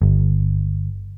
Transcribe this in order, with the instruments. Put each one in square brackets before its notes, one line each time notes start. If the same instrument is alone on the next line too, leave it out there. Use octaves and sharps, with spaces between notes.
[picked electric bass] G1